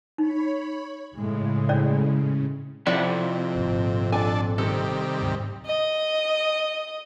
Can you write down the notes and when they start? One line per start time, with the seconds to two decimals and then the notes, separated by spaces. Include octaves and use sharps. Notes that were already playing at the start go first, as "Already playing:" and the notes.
0.18 D#4 C#5 B5
1.18 A2 C#3 G#3
1.69 C#4 D5
2.87 F2 C3 E4 D5 F#5
3.56 G#1 A#2
4.12 D4 A4 G#5
4.58 C3 D#3 G3 A4
5.21 D2 G#2 F#3
5.66 D#5